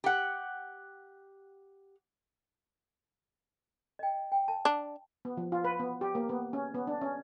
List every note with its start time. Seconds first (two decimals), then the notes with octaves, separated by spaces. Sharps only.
0.04 G4 F#5
3.99 D#5 G5
4.32 G5
4.48 A5
4.65 D4
5.25 B3
5.37 F3
5.52 F4
5.64 B4
5.79 B3
6.01 G4
6.15 A#3
6.29 B3
6.53 C#4
6.74 B3
6.87 D4
7.01 C#4